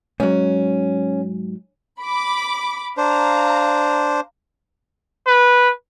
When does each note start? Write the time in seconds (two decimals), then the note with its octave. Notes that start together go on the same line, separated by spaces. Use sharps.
0.20 G#2 F#3 C#4
2.02 B5 D6
2.97 D4 C5 F5 A#5
5.27 B4